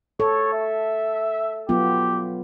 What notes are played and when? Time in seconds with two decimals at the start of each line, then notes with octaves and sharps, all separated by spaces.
0.20 A4 C#5
0.53 E5
1.69 F#3 B3 F4 G4